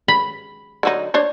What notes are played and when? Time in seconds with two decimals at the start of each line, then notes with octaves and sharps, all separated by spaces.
0.08 B5
0.83 D3 F#3 D#4
1.14 D4 C5 C#5